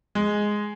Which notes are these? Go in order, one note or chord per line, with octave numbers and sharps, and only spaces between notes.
G#3